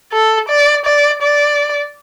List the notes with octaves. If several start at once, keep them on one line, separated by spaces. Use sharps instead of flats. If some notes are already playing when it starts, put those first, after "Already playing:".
A4
D5
D5
D5